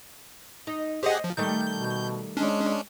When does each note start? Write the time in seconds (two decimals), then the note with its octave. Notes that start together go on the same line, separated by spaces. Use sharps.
0.67 D#4
1.03 G4 G#4 C5 D#5 F#5
1.24 F3
1.37 D#3 G3 A3 G6
1.73 B2
2.37 G#3 C#4 D4